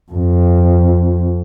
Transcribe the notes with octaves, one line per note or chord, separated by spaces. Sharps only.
F2